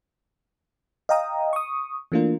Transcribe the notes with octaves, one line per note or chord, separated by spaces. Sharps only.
D#5 F5 G5 A#5 D#6
C#6 D#6
E3 A3 A#3 D4 F4 A#4